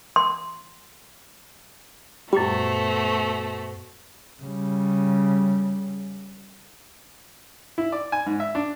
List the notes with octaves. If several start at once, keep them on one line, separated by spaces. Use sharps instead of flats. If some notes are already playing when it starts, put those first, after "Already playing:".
C6
F#2 A#2 G3 A3 B3 F#4 C5 A5
C#3 G3
E4
D5
G#5
G#2
E5
D4